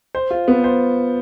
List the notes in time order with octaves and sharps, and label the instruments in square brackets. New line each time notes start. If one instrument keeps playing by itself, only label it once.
[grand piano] C5
F4
B3
C5